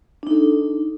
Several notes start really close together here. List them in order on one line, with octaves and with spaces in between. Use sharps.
D4 D#4 A4